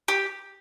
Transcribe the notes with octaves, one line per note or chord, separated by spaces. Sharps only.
G4